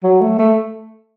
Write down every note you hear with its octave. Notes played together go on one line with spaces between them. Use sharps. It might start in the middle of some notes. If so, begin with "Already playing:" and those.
F#3
A3
A3